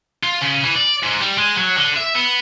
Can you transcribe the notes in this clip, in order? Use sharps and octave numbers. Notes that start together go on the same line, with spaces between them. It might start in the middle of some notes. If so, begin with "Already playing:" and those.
F4
C#3
E3
D5
G#2
G3
G#3
F#3
D3
E5
B3